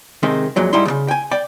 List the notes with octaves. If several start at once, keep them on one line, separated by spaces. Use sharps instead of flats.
C3 D#3 G#3 C4
F2 A#2 F#3 G#3
G#2 G3 D#4 E4 C6
D#2 C#3
G5 G#5
D5 G5